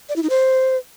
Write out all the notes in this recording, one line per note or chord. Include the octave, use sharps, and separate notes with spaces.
D5
E4
D#4
C5